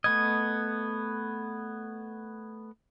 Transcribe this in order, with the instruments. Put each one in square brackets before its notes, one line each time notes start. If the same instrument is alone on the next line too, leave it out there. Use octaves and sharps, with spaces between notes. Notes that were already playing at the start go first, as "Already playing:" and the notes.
[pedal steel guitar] A3 B3 D#5 [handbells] G#6